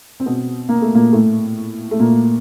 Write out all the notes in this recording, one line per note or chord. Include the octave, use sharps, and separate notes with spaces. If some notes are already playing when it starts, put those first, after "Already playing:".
C4
B2 B3
A#3
A3
A#2 A#3
A2 A3
A3
A#2 A#3